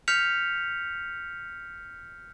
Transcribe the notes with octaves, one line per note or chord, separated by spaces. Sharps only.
F6 G6 B6 C#7 F7